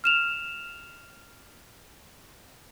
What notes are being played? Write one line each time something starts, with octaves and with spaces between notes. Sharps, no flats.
F6 E7 F7